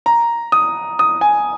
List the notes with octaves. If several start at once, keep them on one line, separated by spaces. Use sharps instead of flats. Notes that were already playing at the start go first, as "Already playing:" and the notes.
A#5
D#6
D#6
G#5